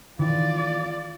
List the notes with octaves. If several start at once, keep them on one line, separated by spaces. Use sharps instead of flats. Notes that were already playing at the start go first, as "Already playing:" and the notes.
D#3 E3 F4 D5